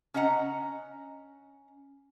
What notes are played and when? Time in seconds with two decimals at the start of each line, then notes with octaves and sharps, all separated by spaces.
0.14 C#4 D4 D#5 F#5 A#5